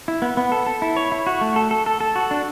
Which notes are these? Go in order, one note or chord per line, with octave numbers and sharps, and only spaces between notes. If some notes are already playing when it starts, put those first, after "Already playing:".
E4
B3
B3
A4
A4
E4
C#5
E4
F#4
A3
A4
A4
A4
A4
F#4
D4